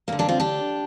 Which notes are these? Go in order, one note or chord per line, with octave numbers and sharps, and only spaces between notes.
D2 D3 A#3
A#3 D4
C4 F4
D4 G4